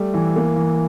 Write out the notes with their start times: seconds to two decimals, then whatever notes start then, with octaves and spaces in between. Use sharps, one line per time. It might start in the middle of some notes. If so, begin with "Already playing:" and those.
Already playing: G3 A3
0.14 E3
0.36 A#3
0.56 E3